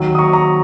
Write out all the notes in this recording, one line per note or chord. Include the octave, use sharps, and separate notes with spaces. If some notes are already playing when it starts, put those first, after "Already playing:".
Already playing: D#2 D#3 F#3
D#6
A#5 C#6
A#5 C#6